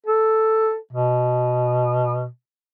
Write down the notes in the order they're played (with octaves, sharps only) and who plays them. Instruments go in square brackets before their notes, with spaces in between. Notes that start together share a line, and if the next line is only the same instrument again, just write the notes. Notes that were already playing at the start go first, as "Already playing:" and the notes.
[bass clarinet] A4
B2